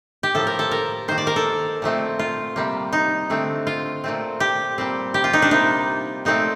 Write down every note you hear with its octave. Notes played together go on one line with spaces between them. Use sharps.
G4
A2 F3 A#3 A4
A#4
A4
A#4
D#3 A#3 C5
D5
A#4
A4
A#2 F3 A3 C4
F4
C3 G3 A#3
D#4
D3 A3 C4
F4
A#2 A3 C4
G4
A#2 G3 C4
G4
F4
D#4
D4
C3 G3 A#3 D#4
A#2 F3 A3 C4 D#4